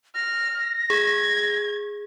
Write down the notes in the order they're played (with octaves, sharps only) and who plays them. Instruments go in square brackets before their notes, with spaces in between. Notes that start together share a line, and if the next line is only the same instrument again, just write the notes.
[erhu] F6 [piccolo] A#6
[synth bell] G#4 [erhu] G#6